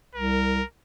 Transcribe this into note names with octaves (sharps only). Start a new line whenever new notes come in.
C2 A#4